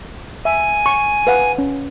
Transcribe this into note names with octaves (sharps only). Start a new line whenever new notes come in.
E5 G#5
C#6
B4 F5 F#5
C#4